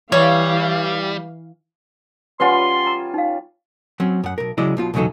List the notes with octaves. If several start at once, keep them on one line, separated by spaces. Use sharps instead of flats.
E3 G3 C#5 F5
G3 C#4 F4 B4 F#5 C6
A#5
D#4 F5
F#3 C4 C#4
F#2 F#5
B1 A#4
C#3 F#3 G#3 E4 D5 D#5
B1 B2 F4
B1 E2 C#3 F#3 D#4 A4